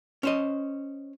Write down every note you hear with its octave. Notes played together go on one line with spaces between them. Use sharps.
C#4 C5 D#5